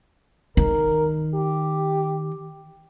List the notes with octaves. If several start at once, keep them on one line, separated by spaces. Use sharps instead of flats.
D#3 A#4
G4